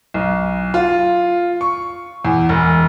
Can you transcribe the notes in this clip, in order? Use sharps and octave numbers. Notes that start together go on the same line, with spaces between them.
B1
F4
C#6
E2
E1